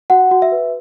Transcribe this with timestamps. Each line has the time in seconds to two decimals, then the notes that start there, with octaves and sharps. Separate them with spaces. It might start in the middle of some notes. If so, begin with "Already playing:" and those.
0.10 F#4 F#5
0.31 F#4
0.42 E5
0.52 B4